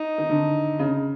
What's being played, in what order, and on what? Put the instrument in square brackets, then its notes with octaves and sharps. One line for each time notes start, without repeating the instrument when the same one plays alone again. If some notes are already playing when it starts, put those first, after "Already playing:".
Already playing: [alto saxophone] D#4
[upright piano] D#3
D3
C#3